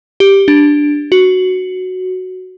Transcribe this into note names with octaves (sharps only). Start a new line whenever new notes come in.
G4
D4
F#4